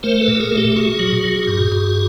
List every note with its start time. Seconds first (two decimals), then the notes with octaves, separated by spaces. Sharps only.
0.03 A3 A#4 C5
0.21 A4 B4
0.28 A#2
0.40 G#4 A#4
0.52 A3
0.57 G4 A4
0.72 A4
0.76 A#2 F#4 G#4
0.99 F#3
1.24 A#2
1.47 G2
1.72 G2